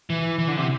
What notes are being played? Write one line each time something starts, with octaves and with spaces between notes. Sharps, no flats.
E3
E3
D3
C3